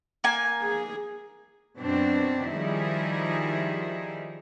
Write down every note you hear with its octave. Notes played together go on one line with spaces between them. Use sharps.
A#3 G#5
G#4
F#2 B2 C4 D4
D#3 F3 G3 D#4 E4 G#4